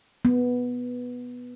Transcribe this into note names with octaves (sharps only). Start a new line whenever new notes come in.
B3